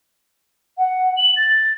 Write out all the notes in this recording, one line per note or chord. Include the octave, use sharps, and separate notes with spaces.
F#5
F#7
A6